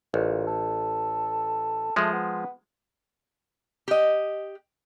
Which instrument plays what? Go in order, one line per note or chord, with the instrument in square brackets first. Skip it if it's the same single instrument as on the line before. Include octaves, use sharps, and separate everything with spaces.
[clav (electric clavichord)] A1 [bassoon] A#2
[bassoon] A4
[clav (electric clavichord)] F3 G#3 [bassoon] A3
[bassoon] B3
[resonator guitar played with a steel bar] G4 D#5